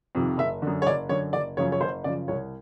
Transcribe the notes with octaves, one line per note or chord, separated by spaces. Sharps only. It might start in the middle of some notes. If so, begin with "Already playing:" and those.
F2 C3 D#3
F#1 E5
D3
F#2
C#5
F#1 D5
F#2 D3 C#5
F#1 D5
F#2 C#3 F3 C#5
C#5
F#1 C5
F#2 C#3 F3 D5
C2 C#5